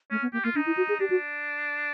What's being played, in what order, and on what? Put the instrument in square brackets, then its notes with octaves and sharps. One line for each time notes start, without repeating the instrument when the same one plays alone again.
[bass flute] A3 [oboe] C#4
[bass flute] B3
[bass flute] A#3 [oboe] G4
[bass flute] A#3 [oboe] F4
[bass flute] D4 [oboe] D#4
[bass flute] E4
F#4
G#4
[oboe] D4 [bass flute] G4
[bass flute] F#4